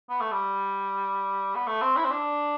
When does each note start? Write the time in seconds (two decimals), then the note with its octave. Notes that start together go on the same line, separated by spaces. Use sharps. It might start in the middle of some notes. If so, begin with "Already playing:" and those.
0.09 B3
0.21 A3
0.32 G3
1.55 B3
1.67 A3
1.82 C4
1.97 E4
2.05 C4
2.11 D4